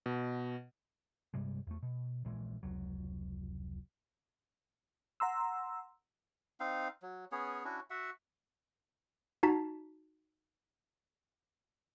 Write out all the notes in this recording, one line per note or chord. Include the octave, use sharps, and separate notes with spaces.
B2
G2 C3 G3 G#3
E2 A3
B2
A#1 A#2 E3 G#3
F1 C#2 F#3
F#5 A#5 C6 E6
C4 D#4 F5
F#3
B3 C#4 G#4 C#5
C#4 D4 E4 F#4
F#4 E5 F#5
D#4 F#4 A5 A#5 B6